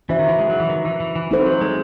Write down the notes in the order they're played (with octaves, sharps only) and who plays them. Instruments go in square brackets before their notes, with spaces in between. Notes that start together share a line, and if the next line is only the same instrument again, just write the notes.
[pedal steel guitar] E3 [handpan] C#4 F#4 C5 E5
[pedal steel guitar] D#3
E3
G#3
F#3
E3
D#3
E3
E3
E3
[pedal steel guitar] E3 [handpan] C4 D#4 A4 C5
[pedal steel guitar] F#3
G#3